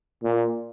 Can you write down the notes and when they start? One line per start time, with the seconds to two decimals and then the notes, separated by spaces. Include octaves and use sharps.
0.24 A#2